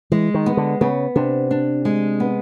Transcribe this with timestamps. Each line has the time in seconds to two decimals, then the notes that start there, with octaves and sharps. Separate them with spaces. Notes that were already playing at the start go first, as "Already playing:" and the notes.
0.11 E3 G#3
0.34 D#3
0.46 B3
0.57 D3
0.81 C#3 B3
1.16 C3 D4
1.51 D4
1.85 G#3
2.20 B3